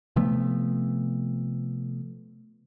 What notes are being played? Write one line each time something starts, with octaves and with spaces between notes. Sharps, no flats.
C3 F3 A3 B3